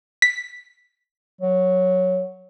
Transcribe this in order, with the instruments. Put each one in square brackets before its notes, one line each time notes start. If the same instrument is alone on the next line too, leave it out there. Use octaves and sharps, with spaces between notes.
[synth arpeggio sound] B6
[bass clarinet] F#3